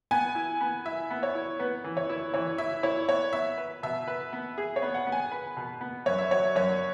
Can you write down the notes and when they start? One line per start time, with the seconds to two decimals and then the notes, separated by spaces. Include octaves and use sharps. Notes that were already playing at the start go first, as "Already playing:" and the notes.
0.11 B3 G#5
0.35 E4
0.61 B3
0.85 E4 E5
1.10 B3
1.23 C#5
1.35 E4
1.59 B3 B4
1.84 E3
1.97 C#5
2.09 E4
2.34 E3 C#5
2.58 E4 E5
2.83 E4 C#5
3.08 B3 C#5
3.33 B3 E5
3.58 B4
3.83 B2 E5
4.08 B4
4.33 B3
4.58 G#4
4.76 C#5
4.82 B3
4.94 F#5
5.07 B3
5.12 G#5
5.31 B4 B5
5.57 B2
5.81 B3
6.06 F#2 C#5
6.18 E5
6.31 F#3 C#5
6.55 F#2 C#5